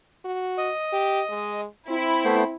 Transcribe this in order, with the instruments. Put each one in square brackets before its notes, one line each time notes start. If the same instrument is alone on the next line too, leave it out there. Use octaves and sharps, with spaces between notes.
[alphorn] F#4
[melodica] D#5
[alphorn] G4
G#3
[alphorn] C4 [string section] E4
[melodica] A3 B3 C5